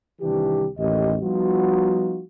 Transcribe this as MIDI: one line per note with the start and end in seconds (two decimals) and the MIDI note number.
0.21 0.67 36
0.21 0.67 51
0.21 0.67 52
0.21 0.67 62
0.21 0.67 67
0.78 1.16 33
0.78 1.16 39
0.78 1.16 67
0.78 1.16 75
1.22 2.21 53
1.22 2.21 55
1.22 2.21 59
1.22 2.21 63
1.22 2.21 65
1.22 2.21 66